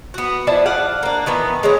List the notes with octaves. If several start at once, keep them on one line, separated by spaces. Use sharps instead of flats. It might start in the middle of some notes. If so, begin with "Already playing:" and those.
B3 F#4
F3 D4 E4 A5
D5 F5 F#5
A#3 D4
D#3 E3 B3
G#3 A3 C#4